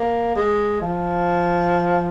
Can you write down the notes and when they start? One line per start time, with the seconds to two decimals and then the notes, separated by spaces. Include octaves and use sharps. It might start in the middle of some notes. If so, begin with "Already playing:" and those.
Already playing: A#3
0.35 G#3
0.81 F3